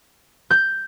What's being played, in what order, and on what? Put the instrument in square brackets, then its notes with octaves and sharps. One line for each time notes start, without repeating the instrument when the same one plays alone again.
[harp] G6